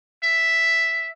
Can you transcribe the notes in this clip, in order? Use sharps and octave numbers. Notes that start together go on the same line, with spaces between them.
E5